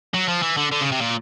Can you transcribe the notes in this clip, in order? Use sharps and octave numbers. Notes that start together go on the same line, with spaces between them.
F#3
F3
E3
D3
D3
C#3
C3
A#2